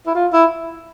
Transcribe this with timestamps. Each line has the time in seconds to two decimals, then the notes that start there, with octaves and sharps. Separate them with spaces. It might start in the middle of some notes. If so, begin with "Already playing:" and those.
0.07 E4
0.15 F4
0.33 E4